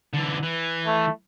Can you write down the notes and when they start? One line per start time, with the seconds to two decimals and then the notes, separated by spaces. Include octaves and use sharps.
0.13 D3 E3
0.43 E3
0.86 A3